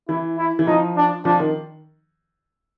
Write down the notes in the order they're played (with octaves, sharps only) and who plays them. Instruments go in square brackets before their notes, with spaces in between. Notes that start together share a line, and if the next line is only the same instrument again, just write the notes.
[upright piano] E3 [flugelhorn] E4
[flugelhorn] E4
[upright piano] E3
[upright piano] F3 [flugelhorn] D#4
[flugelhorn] D4
[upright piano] F3 [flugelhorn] D4
[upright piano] D#3